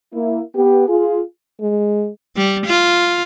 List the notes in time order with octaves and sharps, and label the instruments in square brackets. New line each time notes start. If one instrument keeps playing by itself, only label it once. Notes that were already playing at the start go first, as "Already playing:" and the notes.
[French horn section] A#3 E4
B3 G4
F4 G#4
[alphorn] G#3
[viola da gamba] G3
F4